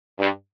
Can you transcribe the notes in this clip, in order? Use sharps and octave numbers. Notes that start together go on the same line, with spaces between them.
G2